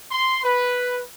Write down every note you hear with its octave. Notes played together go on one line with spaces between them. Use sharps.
C6
B4